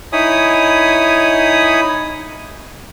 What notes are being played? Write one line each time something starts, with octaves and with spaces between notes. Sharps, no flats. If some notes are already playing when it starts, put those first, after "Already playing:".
D#4 E4 C#5 G#5 B5 D#6